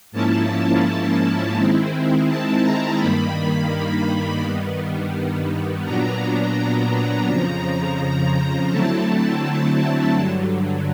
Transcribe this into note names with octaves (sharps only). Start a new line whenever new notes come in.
G#2 F3 A#3 C#4 E4 A5
D#3 G#3 C4 E4
A5
A#5
G2 D#3 G3 A#3 B5
G2 D#3 G3 B3
A#2 F#3 B3 D4 A#5
A#5
F2 C#3 F3
A#5
D3 F#3 A3 C4 E4 A5
G2 D3 F#3